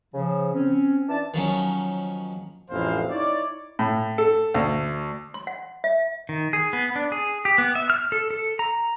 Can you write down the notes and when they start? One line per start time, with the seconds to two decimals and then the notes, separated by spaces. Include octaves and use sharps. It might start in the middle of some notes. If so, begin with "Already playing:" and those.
0.14 C#3 F3
0.55 C4 C#4
1.09 E3 D4 D5 A5
1.34 D#3 F3 F#3 C#4
2.70 A1 F2 G#3 E4 C5 F5
3.08 D#4 E4 C#5 D5
3.79 A2
4.18 A4
4.54 D2
5.34 C6
5.47 F#5
5.84 E5
6.29 D#3
6.53 G#4
6.73 B3
6.96 D4
7.12 G#4
7.45 G4
7.58 B3
7.75 E5
7.90 F6
8.12 A4
8.31 A4
8.59 A#5